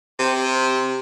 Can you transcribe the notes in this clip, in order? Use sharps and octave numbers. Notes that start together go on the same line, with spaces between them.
C3